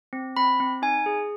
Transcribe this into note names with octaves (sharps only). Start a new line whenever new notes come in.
C4
C4 B5
C4
D#4 G#5
G#4